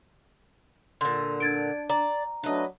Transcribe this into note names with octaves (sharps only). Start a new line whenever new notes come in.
A#2 D3 C6
D4 G#6 A6 D7
D5 A#5
F#3 A3 D4 B4 D#5